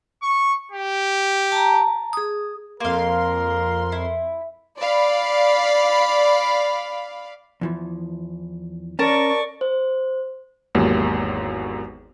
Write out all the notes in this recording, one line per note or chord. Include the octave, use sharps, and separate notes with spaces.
C#6
G4
A5 A#5
G#4 D#6
F2 A#3 A#4 F5 C6
E4
D5 F5 B5
E2 E3 F3
C#4 A#4 D5 A5 A#5 C#6
C5
G#1 E2 F#3 G#3 A#3 G4